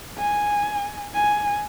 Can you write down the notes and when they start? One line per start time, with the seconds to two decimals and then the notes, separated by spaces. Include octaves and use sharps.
0.18 G#5
1.14 G#5